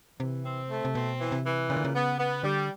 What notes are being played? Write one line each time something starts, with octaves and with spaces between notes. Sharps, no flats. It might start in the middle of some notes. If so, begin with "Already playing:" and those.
C3 E3
C4
A3
C3
B2 C4
E3
C3
E3
A#2 C#3
D3
C#3
B3
B3
D3 G3